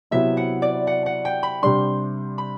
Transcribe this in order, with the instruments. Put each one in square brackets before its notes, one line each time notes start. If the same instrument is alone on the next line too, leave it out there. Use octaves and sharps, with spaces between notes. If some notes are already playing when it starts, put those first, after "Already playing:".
[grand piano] C3 F#3 B3 E4 [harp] E5
[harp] F#5
D5
F#5
F#5
G5
B5
[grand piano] C3 G3 D4 [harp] C6
[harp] B5